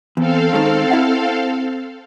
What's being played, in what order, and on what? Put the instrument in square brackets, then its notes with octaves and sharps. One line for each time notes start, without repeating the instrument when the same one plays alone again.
[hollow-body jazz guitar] E2 [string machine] C4 A4 F5
[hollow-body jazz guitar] D#3 G#3 C#4
E4 E5 F#5